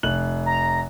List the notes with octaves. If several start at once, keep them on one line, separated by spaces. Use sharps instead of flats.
F1 F#6 F#7
A#5